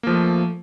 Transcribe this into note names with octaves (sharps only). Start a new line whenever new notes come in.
F3 A3 A#3